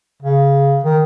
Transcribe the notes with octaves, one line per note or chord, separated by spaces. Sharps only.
C#3
D#3